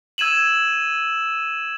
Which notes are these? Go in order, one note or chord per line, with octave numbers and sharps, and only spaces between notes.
E6 G#6 D#7 E7 F#7